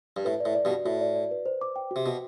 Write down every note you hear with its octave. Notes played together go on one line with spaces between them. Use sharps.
G2
A2 B4
D5
A2
D5
G2 B2
F#4
A2 F#4
D5
D5
B4
C5
D6
G5
F#4
C3
B2 F#4